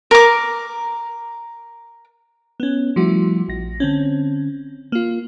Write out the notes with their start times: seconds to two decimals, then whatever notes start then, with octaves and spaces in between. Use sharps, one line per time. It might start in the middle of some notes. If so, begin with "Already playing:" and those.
0.11 A#4 D6
2.60 B3 C#4
2.96 F3 G3 A3 E4 F#4
3.49 A#1 A#6
3.80 D3 C4 C#4
4.92 A#3 F4